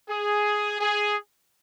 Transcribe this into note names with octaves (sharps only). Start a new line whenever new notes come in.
G#4
G#4